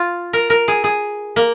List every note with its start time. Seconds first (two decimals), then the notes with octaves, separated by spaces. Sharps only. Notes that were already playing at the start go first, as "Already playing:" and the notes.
Already playing: F4
0.33 A#4
0.50 A#4
0.68 G#4
0.84 G#4
1.36 A#3